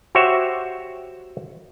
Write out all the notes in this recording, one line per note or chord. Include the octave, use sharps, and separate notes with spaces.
F#4 G4 C5 C#5 E5 F#5